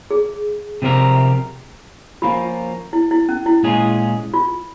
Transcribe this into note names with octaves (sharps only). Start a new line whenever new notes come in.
G#4
C3 F3 C4 G4 A#4
F3 A#3 C#4 F4
E4
E4
C#4
E4
A#2 G#3 C#4 F4 G#4
F4